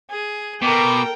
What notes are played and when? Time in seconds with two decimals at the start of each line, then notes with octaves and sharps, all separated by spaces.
0.10 G#4
0.62 B2 A4 A#4 G5 A#5 D6